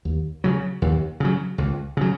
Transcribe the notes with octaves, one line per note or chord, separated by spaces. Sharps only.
D#2
C#3 F#3
D#2
C#3 F#3
C#2
C#3 F#3